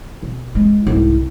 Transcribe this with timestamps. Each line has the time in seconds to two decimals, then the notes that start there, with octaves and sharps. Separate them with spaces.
0.23 B2
0.55 G#3
0.87 C2 G#2